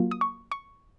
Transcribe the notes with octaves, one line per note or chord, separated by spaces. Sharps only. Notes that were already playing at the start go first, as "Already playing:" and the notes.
Already playing: F#3 A#3 F4
D#6
C#6
C#6